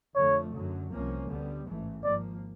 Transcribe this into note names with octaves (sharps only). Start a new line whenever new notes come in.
F2 D3 F3 A3 C#5
F#2 D3 F#3
C2 C3 F3 A#3 C#4
D2 D3 G3 B3
A1 G#2 E3 A3
G#1 G#2 F3 A#3 D5